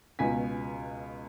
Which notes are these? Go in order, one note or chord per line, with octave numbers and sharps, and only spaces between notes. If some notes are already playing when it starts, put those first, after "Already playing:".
C#2 B2 G#5 B6